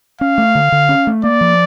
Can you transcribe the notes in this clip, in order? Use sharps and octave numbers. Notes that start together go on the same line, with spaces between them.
C#4 F5
A3
D3
D3
C#4
A3
A#3 D5
F3